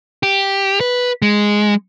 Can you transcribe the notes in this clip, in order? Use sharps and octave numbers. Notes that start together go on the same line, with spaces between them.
G4
B4
G#3